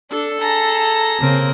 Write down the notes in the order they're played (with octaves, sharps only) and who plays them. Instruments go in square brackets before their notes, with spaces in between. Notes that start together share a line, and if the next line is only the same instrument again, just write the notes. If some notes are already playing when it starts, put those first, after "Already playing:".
[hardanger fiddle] D4 [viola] A4
[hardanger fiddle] G#4 A#5 [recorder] A5
[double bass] C#3 [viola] A#3 C4